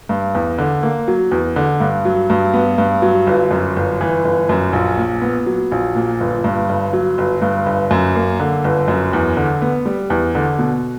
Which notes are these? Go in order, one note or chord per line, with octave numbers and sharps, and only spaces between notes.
G2
E2
D3
A#3
F#3
E2
D3
G2
F#3
G2
B3
G2
F#3
G1
F#2
G1
E3
G1
F#2
A#1
A#2
B3
F#3
A#1
A#2
G1
G2
G1
F#3
G1
G2
G1
F#2
A#3
D3
G1
F#2
E2
D3
B3
G3
E2
D3
B2